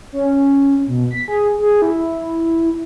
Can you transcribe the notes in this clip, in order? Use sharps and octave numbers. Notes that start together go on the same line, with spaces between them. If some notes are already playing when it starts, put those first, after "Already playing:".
C#4
B2
B6
G#4
G#4
E4